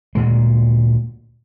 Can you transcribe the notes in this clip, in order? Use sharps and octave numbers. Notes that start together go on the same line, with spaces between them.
D2 A#2 G#3